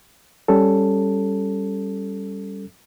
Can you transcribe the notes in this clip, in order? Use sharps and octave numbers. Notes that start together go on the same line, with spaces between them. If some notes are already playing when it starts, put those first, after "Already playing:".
G3 C#4 A4